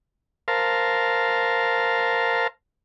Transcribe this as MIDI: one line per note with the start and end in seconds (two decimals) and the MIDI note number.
0.48 2.47 70
0.48 2.47 72
0.48 2.47 77
0.48 2.47 81